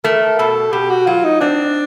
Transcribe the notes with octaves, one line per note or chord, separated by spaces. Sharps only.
A3 A#4
B2 A4
B2 G4
F#4
F#3 F4
D#4
C4 D4